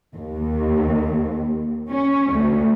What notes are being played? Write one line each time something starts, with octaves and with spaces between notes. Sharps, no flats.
D#2
C#4
D2